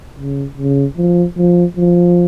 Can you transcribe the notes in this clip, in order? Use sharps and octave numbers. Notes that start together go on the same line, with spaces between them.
C#3
C#3
F3
F3
F3